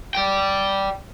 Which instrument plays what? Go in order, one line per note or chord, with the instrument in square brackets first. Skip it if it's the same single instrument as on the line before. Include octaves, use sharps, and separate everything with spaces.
[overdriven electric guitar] D5 G5